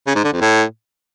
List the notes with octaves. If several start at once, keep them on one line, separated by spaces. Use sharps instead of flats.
C#3
G#2
D3
F2
A2